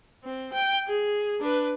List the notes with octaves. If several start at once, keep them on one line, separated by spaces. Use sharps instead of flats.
C4
G5
G#4
D4 B4